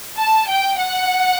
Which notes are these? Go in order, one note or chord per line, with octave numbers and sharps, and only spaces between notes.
A5
G5
F#5